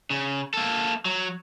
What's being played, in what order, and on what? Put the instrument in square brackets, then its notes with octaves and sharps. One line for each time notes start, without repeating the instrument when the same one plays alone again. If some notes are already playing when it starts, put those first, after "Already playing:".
[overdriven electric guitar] C#3
A#3 A4
F#3